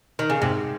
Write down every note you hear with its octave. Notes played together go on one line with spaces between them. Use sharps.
D#3
C#3
G#2 C3